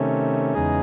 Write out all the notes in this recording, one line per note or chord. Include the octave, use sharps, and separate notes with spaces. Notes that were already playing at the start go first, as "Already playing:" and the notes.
Already playing: C3 D#3 A3 C#4
E2 C#3 G#3 D#4 G#4